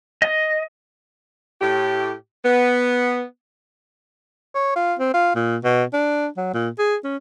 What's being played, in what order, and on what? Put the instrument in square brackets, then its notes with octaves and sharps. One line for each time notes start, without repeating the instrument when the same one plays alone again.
[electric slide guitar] D#5
[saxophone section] A2 G4
B3
[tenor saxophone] C#5
F4
C4
F4
A#2
B2
D4
F#3
A#2
G#4
C#4